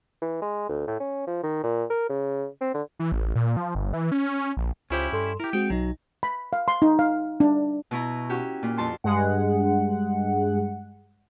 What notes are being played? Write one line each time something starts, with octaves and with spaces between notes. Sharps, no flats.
E3
G#3
D2
A2
C#4
F3
D#3
A#2
A#4
C#3
C4
D3
E3
A1
A#2
F3
G1
E3
C#4
A#1
C#2 C#4 E4 F4 G4 C5
G2 A4 C6
E4 G4 A#4
G#3 C4 F#4 G5
B1 F#3 D#4
B5
F5
C6
D#4
F5
D4
B2 E4 A#5
C#4 F#4 G4
A#2
F2 A5 C6
G2 G#3 F#5